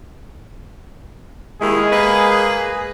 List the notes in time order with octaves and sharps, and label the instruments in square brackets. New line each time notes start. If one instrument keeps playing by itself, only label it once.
[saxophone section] D#2 D#3 E4 [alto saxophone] G#3 [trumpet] G#4
[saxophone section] A#3 B4